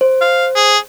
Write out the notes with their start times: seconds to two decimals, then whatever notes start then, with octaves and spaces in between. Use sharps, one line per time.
0.01 C5
0.21 F5
0.56 G#4